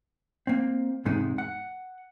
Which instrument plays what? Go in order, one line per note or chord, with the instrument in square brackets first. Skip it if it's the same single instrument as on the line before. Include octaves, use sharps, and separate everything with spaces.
[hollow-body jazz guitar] A#3 C4
E2 G#2 C3 G#3 D#4
F#5